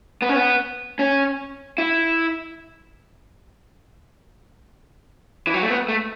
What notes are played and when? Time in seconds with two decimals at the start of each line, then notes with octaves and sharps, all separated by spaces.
0.22 B3
0.29 C#4
0.36 B3
0.99 C#4
1.78 E4
5.47 E3
5.54 F#3
5.62 A3
5.70 B3
5.88 A3